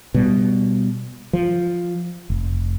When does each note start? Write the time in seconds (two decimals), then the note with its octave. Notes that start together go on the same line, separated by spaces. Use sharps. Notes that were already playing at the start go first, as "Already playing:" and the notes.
0.14 B2 G3
1.33 F3
2.30 F1